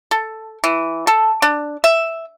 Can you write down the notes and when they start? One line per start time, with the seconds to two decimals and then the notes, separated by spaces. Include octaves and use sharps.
0.11 A4
0.64 E3
1.07 A4
1.42 D4
1.84 E5